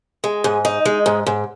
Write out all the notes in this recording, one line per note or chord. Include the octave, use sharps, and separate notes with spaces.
G#3
G#2
D#4
G#3
G#2
G#2